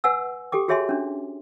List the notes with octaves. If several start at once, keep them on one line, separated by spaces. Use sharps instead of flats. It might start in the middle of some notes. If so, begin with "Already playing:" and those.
B4 F#5 G#5 E6
G4 A4 G5 D6
F#4 G#4 C#5 E5 G#5 C6
C#4 D4